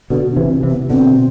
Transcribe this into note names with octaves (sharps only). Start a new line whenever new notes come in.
B2 D3 F#4
D4
C3 E3
C4
C3 E3
B3
B2 D3 C4